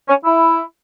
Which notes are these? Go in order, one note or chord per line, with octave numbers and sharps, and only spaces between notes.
C#4
E4